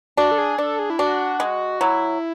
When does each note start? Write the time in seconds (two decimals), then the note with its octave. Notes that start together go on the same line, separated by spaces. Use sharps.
0.17 D4 F#4
0.31 A4
0.38 G#4
0.58 D4 A4
0.79 G#4
0.90 E4
0.99 D4 F#4
1.40 G#3
1.81 F#3 E4